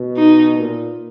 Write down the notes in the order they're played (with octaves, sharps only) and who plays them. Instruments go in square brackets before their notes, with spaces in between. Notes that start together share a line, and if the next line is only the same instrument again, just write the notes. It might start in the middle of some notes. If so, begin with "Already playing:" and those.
Already playing: [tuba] B2
[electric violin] D#4
[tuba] A#2